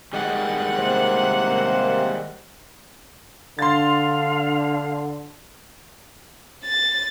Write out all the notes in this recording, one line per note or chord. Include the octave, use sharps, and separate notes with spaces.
D#3 G3 G#3 F#5
C3 A#3 C5
D3 D4 F5 C6 A6
A6